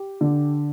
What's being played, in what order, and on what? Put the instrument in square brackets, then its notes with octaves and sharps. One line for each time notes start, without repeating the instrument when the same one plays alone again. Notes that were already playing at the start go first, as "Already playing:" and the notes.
Already playing: [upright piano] G4
D3